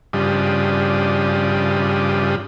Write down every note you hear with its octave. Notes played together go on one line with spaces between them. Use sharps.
G2 C#3 F3 D4 G4 D#6